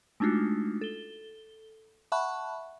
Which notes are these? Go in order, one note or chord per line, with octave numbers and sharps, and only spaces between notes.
G#3 A3 D4 D#4 F4 F#4
A4 G7
E5 F#5 A5 B5 C#6 F#6